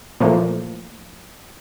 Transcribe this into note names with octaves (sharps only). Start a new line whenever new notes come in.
A#2 E3 F3 A3 A#3